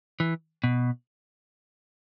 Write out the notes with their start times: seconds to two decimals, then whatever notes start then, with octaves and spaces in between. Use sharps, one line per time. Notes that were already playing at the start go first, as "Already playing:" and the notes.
0.20 E3
0.64 B2